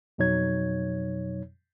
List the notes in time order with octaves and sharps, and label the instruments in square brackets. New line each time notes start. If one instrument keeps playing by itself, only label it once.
[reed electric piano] F2 B2 F#3 D#4 C#5 G#6